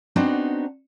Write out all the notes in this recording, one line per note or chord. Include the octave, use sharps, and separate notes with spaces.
B3 C4 D4 D#4 F#4 C5